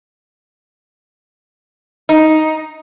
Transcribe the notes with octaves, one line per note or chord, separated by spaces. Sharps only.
D#4